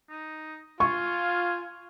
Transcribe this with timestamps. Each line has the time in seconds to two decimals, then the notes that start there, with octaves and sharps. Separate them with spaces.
0.10 D#4
0.80 F4 G#5 C#6